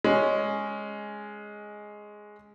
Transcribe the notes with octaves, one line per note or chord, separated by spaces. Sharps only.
G#3 C#4